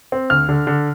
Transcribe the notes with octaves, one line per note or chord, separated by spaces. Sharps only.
C4
D2 F6
D3
D3